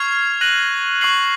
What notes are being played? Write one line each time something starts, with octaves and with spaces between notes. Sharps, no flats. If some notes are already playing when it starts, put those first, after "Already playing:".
Already playing: C#6 F6 G#6 C7 F7
F#6 A#6 D#7 F#7
C#6 F#6 C7 F#7